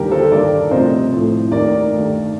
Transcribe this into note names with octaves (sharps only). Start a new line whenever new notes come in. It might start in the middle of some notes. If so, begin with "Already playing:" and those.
Already playing: D#2 D3 G3 G4 A#4
A4 C5
G2 D#3 G3 A#4 D5
C2 C3 F3 A3 C5 D#5
A2 F3 A3
D#2 D#3 A3 A#4 D5
G2 D#3 A3